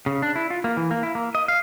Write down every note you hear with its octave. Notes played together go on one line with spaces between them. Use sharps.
C#3
D4
E4
F4
A#3
E3
A#3
E4
A#3
D#5
F5